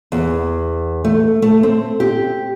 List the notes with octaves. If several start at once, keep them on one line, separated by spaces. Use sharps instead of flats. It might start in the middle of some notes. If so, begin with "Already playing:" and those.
E2
A3
A3
C4
G4